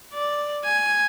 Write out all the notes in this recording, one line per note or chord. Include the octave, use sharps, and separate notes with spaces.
D5
G#5